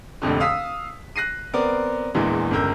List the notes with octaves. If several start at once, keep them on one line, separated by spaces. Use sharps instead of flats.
F1 A#1 F2 D3
F5 D#6 E6 B6
F#6 A#6 C7 D#7
B3 C4 A#4 D5
A#1 E2 A#2 E3 G#3
G1 C#2 A#4 E6 G6